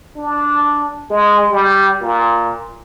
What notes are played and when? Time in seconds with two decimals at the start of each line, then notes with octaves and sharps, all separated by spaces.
0.17 D4
1.11 G#3
1.51 G3
2.02 A#2